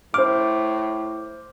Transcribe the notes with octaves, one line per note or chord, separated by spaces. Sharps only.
A2 C5 D6 F6